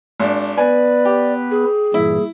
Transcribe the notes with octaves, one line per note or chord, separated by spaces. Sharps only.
G#1 D4
B3 B4 D5 G#5
G4
G#4
G2 A#2 E3 E4